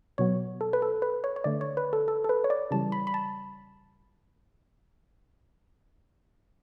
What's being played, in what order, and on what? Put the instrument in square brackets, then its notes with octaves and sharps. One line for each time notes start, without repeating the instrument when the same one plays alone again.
[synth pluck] B2 F#3 B3 C#5
A4
B4
A4
B4
C#5
C#5
D3 A3 D5
C#5
B4
A4
A4
A4
B4
C#5
D5
C#3 E3 G3 A5
B5
B5
A5